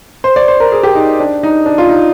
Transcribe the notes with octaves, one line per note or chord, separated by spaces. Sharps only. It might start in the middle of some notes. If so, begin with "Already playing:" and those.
C5
D5
C5
A#4
G#4
G4
D#4
D4
D#4
D4
F4
D#4